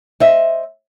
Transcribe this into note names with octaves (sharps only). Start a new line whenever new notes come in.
C5 D#5 E5